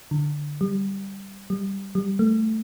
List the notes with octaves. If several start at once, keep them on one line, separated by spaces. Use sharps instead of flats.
D3
G3
G3
G3
A3